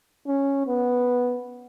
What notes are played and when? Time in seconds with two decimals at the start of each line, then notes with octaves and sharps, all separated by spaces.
0.27 C#4
0.67 B3